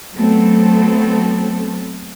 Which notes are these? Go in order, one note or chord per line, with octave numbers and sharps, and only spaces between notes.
F#3 A3 B3 C4 A4